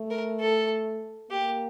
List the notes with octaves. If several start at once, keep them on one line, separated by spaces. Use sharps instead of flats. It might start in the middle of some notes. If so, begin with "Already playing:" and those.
Already playing: A3
A#4
A4
A#3 G4